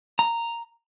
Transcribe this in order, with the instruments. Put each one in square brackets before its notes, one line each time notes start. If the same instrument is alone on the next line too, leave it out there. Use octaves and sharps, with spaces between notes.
[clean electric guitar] A#5